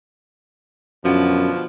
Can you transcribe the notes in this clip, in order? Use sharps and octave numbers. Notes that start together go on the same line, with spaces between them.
F#2 B2 D3 F3